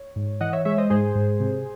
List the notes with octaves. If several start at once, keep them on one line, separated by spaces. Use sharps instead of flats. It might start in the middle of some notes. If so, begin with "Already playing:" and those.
Already playing: C#5
G#2
E3 D#5 F#5
C#5 E5
G#3 C#5 E5
C5 D#5
G#2 G#4 C5
G#2
C3